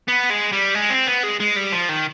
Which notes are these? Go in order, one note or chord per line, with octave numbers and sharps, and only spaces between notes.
B3
G#3
G3
G#3
C4
B3
G#3
G#3
G3
F3
D#3